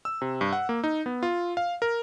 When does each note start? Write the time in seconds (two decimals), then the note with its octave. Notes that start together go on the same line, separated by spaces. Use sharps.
0.05 E6
0.22 C3
0.41 G2
0.53 F#5
0.69 A#3
0.84 D#4
1.06 B3
1.23 F4
1.57 F5
1.82 A#4